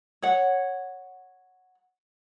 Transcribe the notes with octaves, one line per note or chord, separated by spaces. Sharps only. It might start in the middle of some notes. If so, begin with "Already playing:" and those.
C#5 F#5